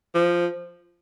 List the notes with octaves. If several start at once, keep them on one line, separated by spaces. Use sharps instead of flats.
F3